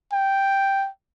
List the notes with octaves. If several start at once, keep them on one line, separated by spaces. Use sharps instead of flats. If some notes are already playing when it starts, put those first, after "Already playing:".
G5